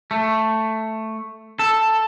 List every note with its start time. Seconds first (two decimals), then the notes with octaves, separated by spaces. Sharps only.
0.11 A3
1.59 A4